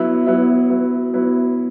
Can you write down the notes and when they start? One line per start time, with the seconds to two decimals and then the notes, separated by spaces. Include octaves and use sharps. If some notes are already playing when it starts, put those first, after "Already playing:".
Already playing: F#3 B3 E4
0.26 F#3 B3 E4
0.70 F#3 B3 E4
1.13 F#3 B3 E4